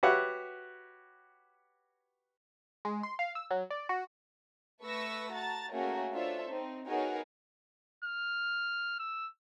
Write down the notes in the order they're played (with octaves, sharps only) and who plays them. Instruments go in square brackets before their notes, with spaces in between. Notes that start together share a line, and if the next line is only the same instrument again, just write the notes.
[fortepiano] F#4 G4 B4 C#5 E5 F#5
[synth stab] G#3
C6
F5
E6
F#3
D5
F#4
[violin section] A3 B4 C#6 E6 A#6
F#4 A5 A#5 A6
A3 A#3 C#4 F#4 G#4 A#4
D4 F4 A4 C5 C#5 E5
C4 D#4
B3 D#4 F#4 G#4 A#4 C#5
[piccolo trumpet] F6
E6